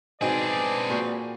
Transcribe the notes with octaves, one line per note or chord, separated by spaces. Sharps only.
G#2 B2 G#3 C4 D4 G#4 B4 D5
A#2 A#3 F#4 C5